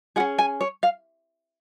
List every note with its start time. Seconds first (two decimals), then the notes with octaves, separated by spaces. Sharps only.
0.16 C#4 F4 G#4 F#5
0.38 G#5
0.61 C#5
0.83 F5